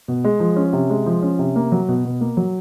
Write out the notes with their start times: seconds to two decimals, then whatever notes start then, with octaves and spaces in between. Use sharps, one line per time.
0.08 B2
0.24 G#3
0.40 F3
0.56 C#4
0.73 C3
0.90 G#3
1.06 F3
1.22 C#4
1.39 C3
1.56 A#3
1.72 F#3
1.88 B2
2.05 B2
2.21 A#3
2.37 F#3